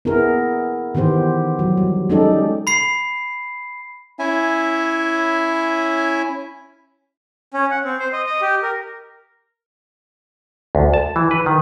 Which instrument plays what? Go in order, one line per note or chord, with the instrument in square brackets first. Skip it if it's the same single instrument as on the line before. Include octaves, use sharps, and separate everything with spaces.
[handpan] B3 E4 G#4 A#4
D#3 E3 B3 G4 C5
F#3
G3
G#3 C#4 D#4 G4 A4 D5
[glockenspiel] B5 C7
[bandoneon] C#4 E4 E5 G#5
[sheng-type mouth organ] C#4
F#5
C4
C5
D#5
D#5
G4
A#4
[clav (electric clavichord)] D2
A5
E3
B4
D#3